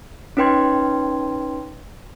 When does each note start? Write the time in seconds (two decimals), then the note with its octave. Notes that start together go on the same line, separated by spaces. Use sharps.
0.37 C#4 D#4 B4 G5 C6 G#6